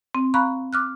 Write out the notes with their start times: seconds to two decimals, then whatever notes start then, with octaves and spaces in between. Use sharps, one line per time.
0.15 C4
0.34 F5 A#5 B5 C#6 F#6
0.73 D6 F6 F#6